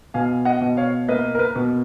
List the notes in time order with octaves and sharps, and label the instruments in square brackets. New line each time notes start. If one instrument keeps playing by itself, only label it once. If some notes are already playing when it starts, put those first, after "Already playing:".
[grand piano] B2 F5 G#5
D#5 F#5
B2
C#5 F5
A#3 B4 D#5
A#4
B4
B2